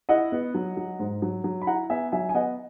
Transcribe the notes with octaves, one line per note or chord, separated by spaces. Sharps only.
E4 D#5 F#5
B3
F#3
F#3
G#2
F#3
F#3
B5
E4 F#5 A#5
B3 E5 G#5
F#3 E5 G#5
G#5
B3 D#5 F#5